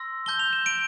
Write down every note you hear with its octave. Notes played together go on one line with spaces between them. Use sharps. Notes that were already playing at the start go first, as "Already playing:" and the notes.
Already playing: C6 E6 A#6
A5 D6 G6 G7
F7
E7
D7